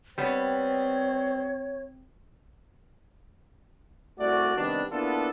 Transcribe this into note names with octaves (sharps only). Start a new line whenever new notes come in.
G3 B3 C4 C#5
C2 A3 F#4 D5
C3 D#3 G3 B3 D4
A#3 B3 D4 E4 F4 A4